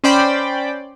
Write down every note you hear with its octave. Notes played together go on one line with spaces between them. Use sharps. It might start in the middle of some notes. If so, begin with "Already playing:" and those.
C#4 C5 D5 G5 B5